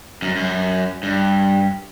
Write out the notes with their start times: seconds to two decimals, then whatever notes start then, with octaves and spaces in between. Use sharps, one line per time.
0.22 F#2
0.37 F#2
1.03 G2